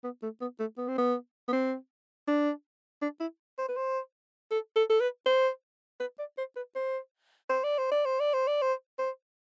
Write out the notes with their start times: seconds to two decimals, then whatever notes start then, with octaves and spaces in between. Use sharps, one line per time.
0.04 B3
0.23 A3
0.41 B3
0.60 A3
0.78 B3
0.88 C4
0.98 B3
1.48 B3
1.53 C4
2.27 D4
3.02 D4
3.20 E4
3.58 C5
3.68 B4
3.77 C5
4.51 A4
4.76 A4
4.90 A4
5.00 B4
5.26 C5
6.00 B4
6.19 D5
6.38 C5
6.56 B4
6.75 C5
7.49 C5
7.64 D5
7.78 C5
7.92 D5
8.05 C5
8.20 D5
8.34 C5
8.47 D5
8.62 C5
8.99 C5